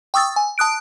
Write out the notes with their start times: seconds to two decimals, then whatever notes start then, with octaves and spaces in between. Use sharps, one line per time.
0.14 G5 C#6 D#6 E6 A6
0.36 G#5
0.58 A5 D#6 F#6 D7